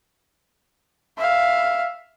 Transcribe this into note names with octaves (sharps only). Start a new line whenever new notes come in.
E5 F5